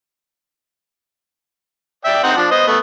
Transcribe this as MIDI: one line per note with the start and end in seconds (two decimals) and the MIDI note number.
2.05 2.22 74
2.05 2.22 76
2.05 2.22 79
2.23 2.37 60
2.23 2.37 63
2.23 2.37 78
2.37 2.48 53
2.37 2.48 62
2.51 2.65 59
2.51 2.65 72
2.51 2.65 75
2.67 2.77 57
2.67 2.77 59